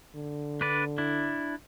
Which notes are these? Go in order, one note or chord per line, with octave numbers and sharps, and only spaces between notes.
D3
D4 B4 D5
D4 E4